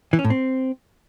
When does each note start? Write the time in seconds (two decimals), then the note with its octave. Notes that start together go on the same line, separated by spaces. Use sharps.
0.13 E3
0.19 C#4
0.25 A2
0.30 C4